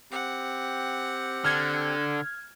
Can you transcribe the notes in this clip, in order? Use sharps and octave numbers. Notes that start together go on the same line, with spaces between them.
C4 G4 F#5
D3 F6 G#6